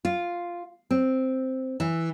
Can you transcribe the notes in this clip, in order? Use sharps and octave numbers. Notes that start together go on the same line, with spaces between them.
F4
C4
E3